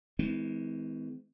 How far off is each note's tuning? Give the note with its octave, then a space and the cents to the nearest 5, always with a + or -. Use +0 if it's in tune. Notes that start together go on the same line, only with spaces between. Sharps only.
E3 -40 G#3 +10 C4 -40